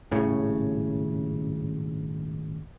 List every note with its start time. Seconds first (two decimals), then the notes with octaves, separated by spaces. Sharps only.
0.11 D#1 G#1 A2 C#3